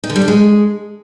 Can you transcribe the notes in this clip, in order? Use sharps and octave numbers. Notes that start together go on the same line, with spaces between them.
D#4
D3
G3
D4
G#3